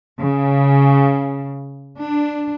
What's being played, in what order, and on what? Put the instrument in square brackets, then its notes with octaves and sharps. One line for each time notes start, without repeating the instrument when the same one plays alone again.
[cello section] C#3
D4